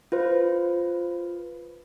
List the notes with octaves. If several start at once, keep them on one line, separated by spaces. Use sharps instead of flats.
F4 B4 C5